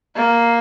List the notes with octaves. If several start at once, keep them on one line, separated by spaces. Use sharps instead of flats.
A#3